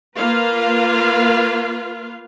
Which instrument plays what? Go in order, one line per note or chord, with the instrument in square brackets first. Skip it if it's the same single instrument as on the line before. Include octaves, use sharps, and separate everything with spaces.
[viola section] A#3 F4 B4 F5